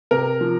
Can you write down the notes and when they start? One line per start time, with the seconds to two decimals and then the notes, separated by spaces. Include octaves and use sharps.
0.11 C3 A#4
0.41 F3